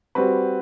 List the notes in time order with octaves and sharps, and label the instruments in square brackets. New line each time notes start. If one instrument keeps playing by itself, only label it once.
[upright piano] G3 C4 F#4 B4